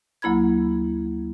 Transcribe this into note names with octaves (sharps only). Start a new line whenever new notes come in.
D2 F#3 A#3 E4 B5 G#6